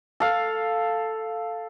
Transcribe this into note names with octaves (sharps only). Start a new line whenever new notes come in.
A4 F5